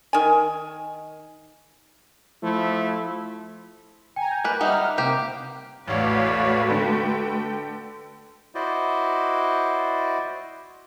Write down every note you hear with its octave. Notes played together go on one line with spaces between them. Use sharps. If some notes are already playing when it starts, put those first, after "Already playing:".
D#3 G#5
F3 A3 E4
G5 G#5 A#5
G6
A#3 B4
G3 D#4 E5 F#5 F6
A#5
C3 A#3 G4 C5
A1 E2 A3 F#4 B4 C#5 D5 F5
D3 A4 G5
E4 F#4 C5 D5 D#5